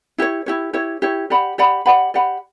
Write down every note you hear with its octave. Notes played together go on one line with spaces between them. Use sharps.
E4 G4 C#5
E4 G4 C#5
E4 G4 C#5
E4 G4 C#5
G4 D5 F#5 B5
G4 D5 F#5 B5
G4 D5 F#5 B5
G4 D5 F#5 B5